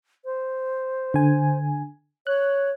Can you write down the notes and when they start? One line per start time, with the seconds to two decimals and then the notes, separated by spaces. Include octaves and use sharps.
0.25 C5
1.14 D3 G#5
2.27 C#5 F#6